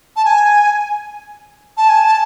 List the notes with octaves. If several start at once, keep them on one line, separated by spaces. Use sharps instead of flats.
A5
G#5
A5
G#5
A5